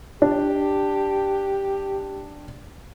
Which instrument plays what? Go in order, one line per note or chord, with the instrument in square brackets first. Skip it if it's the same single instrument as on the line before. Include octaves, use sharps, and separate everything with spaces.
[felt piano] D4 [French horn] G4